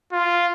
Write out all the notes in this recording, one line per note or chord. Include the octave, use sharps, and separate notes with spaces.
F4